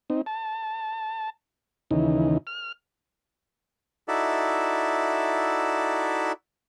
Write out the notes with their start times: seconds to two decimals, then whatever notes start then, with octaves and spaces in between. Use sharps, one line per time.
0.10 C4 D#4
0.26 A5
1.91 D#2 C#3 E3 D#4
2.47 F6
4.08 D#4 E4 F#4 A4 D5 E5